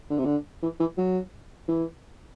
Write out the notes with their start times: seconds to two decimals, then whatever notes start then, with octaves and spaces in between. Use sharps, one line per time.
0.10 D3
0.18 C3
0.25 D3
0.63 E3
0.80 E3
0.98 F#3
1.68 E3